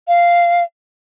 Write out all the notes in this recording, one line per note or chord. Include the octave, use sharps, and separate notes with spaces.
F5